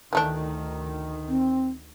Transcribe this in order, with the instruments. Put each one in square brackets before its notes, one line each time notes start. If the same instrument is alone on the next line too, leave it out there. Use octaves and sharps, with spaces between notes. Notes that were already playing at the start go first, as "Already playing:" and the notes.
[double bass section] D2 D#3 [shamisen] E3 A3 D4
[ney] C4